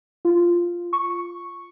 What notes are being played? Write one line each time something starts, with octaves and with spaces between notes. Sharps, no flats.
F4
C#6